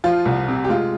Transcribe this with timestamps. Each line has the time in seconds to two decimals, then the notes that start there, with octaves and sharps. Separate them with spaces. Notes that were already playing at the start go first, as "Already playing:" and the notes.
0.04 F3 F4
0.25 C2
0.48 C3
0.64 G4
0.69 G#3 F4